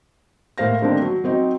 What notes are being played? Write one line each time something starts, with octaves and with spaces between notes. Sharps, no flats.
A2 A#3 C5 F5 A#6
D3 D#3 A3 A#3 C4 D4
F#3
F#3 C4 D#4